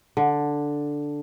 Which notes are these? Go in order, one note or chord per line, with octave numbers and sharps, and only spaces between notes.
D3